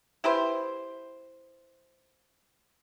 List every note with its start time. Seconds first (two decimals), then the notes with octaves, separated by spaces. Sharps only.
0.24 E4 G4 B4 C5